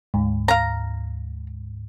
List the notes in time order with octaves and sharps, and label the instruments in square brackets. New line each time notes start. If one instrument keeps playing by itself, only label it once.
[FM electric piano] D2 G#2
[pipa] F5 A#5